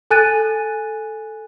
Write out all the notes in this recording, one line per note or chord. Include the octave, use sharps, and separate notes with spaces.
A4 G#5 F#6 A6 D#7